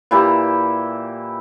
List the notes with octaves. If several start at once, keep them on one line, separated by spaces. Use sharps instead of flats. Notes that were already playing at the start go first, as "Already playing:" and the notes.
A#2 E3 E4 G4